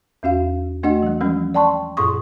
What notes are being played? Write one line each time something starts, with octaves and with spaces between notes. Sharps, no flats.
E2 C#4 F#4 F5
A3 D4 F#4 D#5 F#5
E3 G3
E3 F3 G3 G#3 C#4
D5 G5 A5 C6 C#6
F#2 A#2 G#4 C6 C#6 D#6